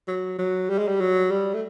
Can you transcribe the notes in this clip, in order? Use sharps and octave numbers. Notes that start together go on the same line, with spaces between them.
F#3
F#3
G3
G#3
G3
F#3
G3
A3